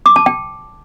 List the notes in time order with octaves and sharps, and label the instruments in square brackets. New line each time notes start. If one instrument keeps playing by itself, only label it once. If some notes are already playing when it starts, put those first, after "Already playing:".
[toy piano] D6
A5
G5